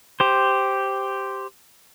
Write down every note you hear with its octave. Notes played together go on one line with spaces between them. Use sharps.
G4 C5